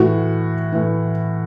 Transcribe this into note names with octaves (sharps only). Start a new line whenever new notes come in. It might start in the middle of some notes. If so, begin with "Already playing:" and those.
Already playing: A2 E3 F#4
A2 E3